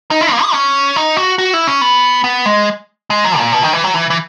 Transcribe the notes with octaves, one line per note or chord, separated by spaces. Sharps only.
D#4
E4
A#3
G#4
C#4
D#4
F#4
F#4
E4
C#4
B3
B3
G#3
G#3
F#3
A#2
B2
D#3
E3
F#3
E3
E3